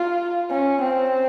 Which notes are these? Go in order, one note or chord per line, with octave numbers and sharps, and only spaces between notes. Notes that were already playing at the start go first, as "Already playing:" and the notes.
Already playing: F4
C#4
C4